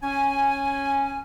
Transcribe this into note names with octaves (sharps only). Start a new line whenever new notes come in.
C#4 G#5